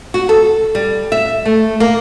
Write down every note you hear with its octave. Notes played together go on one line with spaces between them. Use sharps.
F#4
A4
G3
E5
A3
A#3